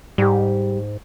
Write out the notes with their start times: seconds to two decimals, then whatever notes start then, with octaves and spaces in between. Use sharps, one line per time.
0.18 G#2 G3 G4